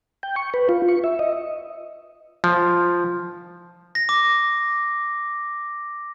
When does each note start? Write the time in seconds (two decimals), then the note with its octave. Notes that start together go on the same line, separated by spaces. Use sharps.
0.23 G5
0.36 C#6
0.54 B4
0.69 F4
0.89 C#6
1.04 E5
1.19 D#5
2.44 F3
3.95 A#6
4.09 D6